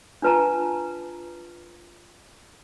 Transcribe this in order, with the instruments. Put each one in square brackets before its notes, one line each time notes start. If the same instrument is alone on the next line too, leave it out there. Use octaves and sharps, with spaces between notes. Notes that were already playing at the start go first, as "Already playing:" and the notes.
[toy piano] D4 F4 B4 A5 A#5